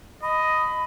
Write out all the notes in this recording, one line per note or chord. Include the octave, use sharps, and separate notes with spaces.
D#5 B5